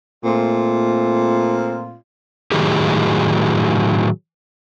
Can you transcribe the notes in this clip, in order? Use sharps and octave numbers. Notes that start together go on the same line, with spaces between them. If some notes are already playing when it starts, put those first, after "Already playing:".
A#2 A3 C4 F4
A2 D#3 F#3 D#4 G4 G#4